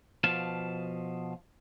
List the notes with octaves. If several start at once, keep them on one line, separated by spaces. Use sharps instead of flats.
B2 F3 F5 A5